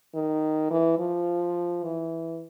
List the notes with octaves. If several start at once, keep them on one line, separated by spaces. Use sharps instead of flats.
D#3
E3
F3
E3